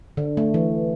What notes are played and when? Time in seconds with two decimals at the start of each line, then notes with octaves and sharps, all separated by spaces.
0.17 D3
0.37 A3
0.54 E3